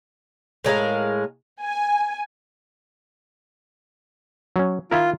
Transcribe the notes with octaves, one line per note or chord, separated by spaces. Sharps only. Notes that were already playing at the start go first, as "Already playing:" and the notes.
A2 G#3 A#4 F5
G#5
F#3 C#4
D#3 E4 F4 A#4